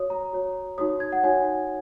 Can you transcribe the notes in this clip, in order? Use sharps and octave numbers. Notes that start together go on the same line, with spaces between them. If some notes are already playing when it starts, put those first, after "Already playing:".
Already playing: F#4 C#5 D#6
A#5
F#4 C#5
D#4 F#4 C#5 D#6
G#6
F#5
D#4 F#4 C#5 G#5